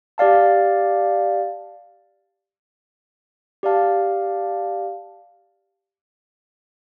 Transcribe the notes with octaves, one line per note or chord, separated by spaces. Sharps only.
G4 D5 F5 A5
G4 D5 F5 A5